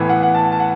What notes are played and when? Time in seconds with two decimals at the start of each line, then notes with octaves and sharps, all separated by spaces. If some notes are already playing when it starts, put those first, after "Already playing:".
Already playing: A2 E3 B3
0.09 F#5
0.23 F#5
0.34 A5
0.52 A5
0.60 F#5